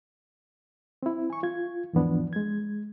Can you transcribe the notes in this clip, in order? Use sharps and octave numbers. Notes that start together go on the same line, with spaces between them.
C4 E4
G#5 C#6
F4 G#6
E2 G#2 E3 F3 B3 D4
G#3 G#6